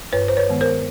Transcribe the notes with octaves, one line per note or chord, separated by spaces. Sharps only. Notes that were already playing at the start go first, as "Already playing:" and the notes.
G2 B4 C#5
C5
B4 C#5
D#3 G#3 B3
A#4 C5